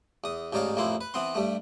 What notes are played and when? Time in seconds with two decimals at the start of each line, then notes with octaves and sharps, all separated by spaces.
0.24 E2 D#6
0.53 A1 G#2 D#4 C#5 D5 F5
0.77 A1 F2 A#3 E4 C6
1.01 B4
1.14 E3 B3 C4 C6
1.35 G2 G3 A3